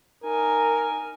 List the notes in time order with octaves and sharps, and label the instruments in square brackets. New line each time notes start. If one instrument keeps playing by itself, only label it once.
[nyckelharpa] D#4 G#5 [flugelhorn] A#4